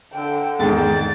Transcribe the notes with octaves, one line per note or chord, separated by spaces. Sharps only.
D3 G5
E2 G#2 D#3 G5 A6